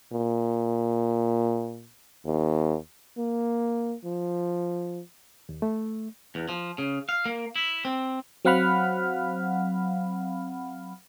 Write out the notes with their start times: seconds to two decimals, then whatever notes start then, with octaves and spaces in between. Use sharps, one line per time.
0.13 A#2
2.25 D#2
3.18 A#3
4.04 F3
5.49 D#2
5.62 A3
6.35 E2
6.49 F3
6.78 C#3
7.09 F5
7.25 A#3
7.56 E4
7.85 C4
8.45 F#3 C4 F5 F#5 B5 F6